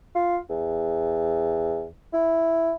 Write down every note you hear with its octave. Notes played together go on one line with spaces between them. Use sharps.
F4
E2
E4